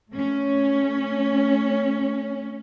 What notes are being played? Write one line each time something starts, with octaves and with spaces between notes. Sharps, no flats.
A3 C#4